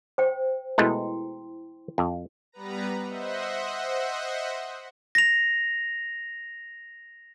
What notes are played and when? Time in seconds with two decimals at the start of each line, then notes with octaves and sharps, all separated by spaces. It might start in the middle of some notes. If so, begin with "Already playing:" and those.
0.18 C5 G5
0.78 B2 G#3 A3 E4 G5 C6
1.98 F2
2.52 G3 B3 B4 A#5
3.06 C5 D#5 E5 F#5
5.15 A#6 F7